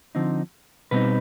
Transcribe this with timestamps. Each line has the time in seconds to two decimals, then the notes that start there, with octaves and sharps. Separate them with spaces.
0.15 D3 F3 C4 D#4
0.91 B2 G3 C4 D#4 B4